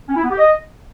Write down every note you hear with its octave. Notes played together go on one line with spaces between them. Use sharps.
C#4
E4
B3
G4
D#5